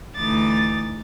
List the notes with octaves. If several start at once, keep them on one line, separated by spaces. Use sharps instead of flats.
D2 E3 D#4 D6 A6